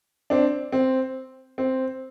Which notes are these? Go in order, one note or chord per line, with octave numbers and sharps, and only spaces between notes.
C4 D4
C4
C4